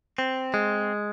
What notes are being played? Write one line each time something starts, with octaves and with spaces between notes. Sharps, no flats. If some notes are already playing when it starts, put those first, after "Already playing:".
C4
G#3